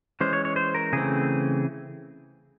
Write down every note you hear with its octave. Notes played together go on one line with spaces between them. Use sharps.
E3 G#3 C#4 C5
C#5
C#5
C5
A#4
C#3 E3 A3 C4 G#4